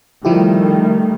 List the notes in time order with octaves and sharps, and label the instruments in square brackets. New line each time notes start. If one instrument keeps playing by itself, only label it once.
[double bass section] D#3 G3 A3 [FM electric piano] F3 E4 G4